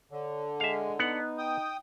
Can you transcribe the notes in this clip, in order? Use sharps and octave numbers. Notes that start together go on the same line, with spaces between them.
D3 C#5
G#3 E5 F5
B3 D#4 F#5
G5 D#6